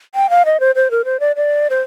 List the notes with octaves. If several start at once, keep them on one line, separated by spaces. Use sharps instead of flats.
G5
F5
D#5
C5
C5
A#4
C5
D5
D5
C5